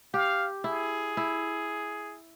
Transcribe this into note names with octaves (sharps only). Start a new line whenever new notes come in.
G4 F5
E4 G#4
E4